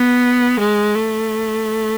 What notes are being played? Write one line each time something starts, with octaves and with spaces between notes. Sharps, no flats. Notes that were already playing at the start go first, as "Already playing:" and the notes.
Already playing: B3
G#3
A3